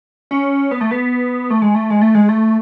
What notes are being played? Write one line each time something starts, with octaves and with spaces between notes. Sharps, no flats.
C#4
B3
A3
B3
A3
G#3
A3
G#3
A3
G#3
A3